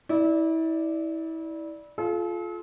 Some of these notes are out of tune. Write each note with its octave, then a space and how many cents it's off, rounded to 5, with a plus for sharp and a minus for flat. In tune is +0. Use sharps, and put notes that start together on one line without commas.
E4 -30 D5 +0
F4 +0 A4 -45